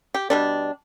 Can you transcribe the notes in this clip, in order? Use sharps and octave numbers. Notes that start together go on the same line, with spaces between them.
G4
B2 G3 D4